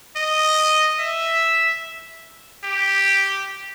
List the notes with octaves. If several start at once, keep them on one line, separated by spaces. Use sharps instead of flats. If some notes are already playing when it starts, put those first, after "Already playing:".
D#5
E5
G4